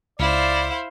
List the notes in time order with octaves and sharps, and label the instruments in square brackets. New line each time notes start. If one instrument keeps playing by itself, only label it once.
[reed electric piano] C#2 [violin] E4 C5 [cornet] D5 [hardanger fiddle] F5